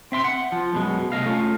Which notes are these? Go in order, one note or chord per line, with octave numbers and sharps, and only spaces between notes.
C4 E5 C6
F#5
F3
F#2 B2 G#3
C2 A3 D#5 F5
A3 C#4 F4